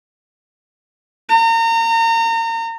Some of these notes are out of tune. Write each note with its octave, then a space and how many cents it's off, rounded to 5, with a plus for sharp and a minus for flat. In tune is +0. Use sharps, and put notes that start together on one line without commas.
A#5 -35